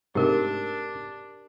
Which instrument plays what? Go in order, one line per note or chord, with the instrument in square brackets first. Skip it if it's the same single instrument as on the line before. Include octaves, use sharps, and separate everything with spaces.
[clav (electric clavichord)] G#2 C3 A3 [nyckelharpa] D4 [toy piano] G4 A#4